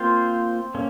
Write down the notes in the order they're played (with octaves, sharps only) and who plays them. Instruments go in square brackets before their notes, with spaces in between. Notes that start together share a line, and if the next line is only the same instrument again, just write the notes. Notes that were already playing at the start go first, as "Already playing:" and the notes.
Already playing: [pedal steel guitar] A#3 F4 C5 F5 [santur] C4
[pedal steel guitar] A#3 C#4